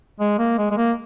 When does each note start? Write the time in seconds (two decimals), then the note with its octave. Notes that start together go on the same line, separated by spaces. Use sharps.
0.20 G#3
0.39 A#3
0.58 G#3
0.71 G#3
0.77 A#3